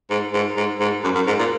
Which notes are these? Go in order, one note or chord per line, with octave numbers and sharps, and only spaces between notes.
G#2
G#2
G#2
G#2
F#2
F#2
G#2
A#2